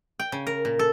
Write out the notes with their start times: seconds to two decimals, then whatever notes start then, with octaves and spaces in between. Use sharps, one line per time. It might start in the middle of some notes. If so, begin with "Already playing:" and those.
0.19 G5
0.32 C#3
0.47 A#4
0.65 A#2
0.79 A4